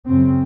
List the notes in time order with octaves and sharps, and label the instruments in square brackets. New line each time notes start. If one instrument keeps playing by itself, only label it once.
[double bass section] F#2 C#3 C4